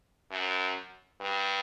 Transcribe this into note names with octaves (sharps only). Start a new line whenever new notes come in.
F#2
G2